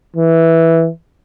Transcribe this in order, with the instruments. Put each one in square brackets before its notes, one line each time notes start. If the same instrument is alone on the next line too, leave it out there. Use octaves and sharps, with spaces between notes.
[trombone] E3